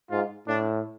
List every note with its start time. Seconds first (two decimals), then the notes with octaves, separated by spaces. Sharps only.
0.10 G#2 F4
0.47 A2 D4